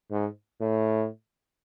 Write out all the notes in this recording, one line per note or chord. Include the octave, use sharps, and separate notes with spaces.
G#2
A2